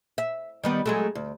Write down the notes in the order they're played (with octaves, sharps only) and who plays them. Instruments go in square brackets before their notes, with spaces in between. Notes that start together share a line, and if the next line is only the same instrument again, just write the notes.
[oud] E5
D#3 G3 B3
F#3 G#3 A3
D2